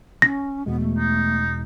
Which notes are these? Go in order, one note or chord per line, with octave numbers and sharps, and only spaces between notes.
C#4 A#6
E2 B2 G#3 B3
A3
D#4